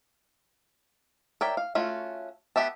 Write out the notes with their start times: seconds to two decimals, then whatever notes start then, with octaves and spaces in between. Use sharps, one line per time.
1.41 A#4 C#5 D5 E5 G5
1.57 F5
1.75 A3 C#4 F4 F#4
2.56 B3 G4 E5 A5